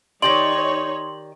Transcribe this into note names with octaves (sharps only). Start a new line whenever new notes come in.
D#3 D#4 G4 C#5 D5 C6 F#7